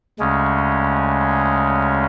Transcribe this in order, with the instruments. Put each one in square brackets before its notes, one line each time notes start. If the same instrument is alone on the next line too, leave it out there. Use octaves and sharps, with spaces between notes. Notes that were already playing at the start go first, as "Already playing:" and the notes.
[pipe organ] D2 C#3 G#3 C#4